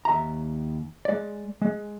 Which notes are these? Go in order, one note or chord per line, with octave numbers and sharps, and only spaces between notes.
D#2 E5 A#5
G#3 D5
G#3